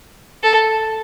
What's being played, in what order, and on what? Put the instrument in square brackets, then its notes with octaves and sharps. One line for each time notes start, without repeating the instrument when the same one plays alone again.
[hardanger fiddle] A4